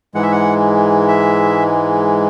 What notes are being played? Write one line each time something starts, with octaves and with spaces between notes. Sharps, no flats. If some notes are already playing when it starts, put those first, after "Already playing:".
G#2 E3 G#3 F#5
E5
F#5
E5